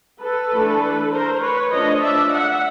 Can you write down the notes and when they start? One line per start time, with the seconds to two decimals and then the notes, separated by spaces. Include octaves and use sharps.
0.21 A4 B4
0.51 E3 A3 D4
1.12 A#4 C5
1.42 B4 C#5
1.72 F3 A3 D4 C#5 D#5
2.02 D5 E5
2.32 E5 F#5